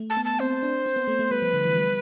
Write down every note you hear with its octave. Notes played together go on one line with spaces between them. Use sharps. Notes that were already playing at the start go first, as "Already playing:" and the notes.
Already playing: A3
A5
B3
A5
C4 C5
D4
C4
B3
A3
A3
G3 B4
F3
D3
E3
G3